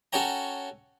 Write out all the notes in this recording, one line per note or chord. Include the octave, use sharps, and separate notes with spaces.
C#4 F#4 A4 C#5 G5 A#5